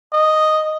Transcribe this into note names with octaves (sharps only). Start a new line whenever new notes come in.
D#5